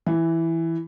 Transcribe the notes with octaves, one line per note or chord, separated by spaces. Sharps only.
E3